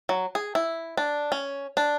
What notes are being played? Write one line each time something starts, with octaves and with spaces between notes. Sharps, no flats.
F#3
G#4
E4
D4
C#4
D4